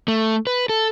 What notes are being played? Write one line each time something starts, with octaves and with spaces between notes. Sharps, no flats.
A3
B4
A4